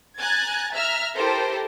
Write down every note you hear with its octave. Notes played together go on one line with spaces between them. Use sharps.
G#5 A#5 F#6 G#6 A6
E5 A#5 F6
E4 G4 A4 A#4 C5